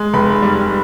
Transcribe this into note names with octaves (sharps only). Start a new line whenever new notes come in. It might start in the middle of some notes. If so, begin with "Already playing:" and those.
Already playing: G#3
F1 B5
G3